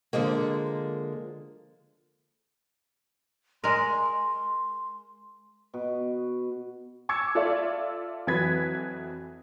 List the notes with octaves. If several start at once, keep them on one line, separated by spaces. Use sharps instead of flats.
D3 F3 G#3 A#3
G#3 A#4 C6
B2
C#6 D6 E6 G#6 C#7
F4 A4 D5 E5
F2 E3 F#3 B4 G#6 B6